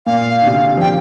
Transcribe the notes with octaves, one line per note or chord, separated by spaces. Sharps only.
A#2 F5
D3
C3
F3 G5